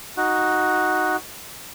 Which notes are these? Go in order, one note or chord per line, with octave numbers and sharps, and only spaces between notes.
D#4 F#4